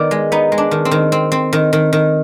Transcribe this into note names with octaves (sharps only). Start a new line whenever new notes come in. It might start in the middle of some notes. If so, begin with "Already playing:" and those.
Already playing: D#3 B3 D5
G#3
B3 D#4
G#3
D4
D#3
C4
D#3
C4
C4
D#3
D#3
D#3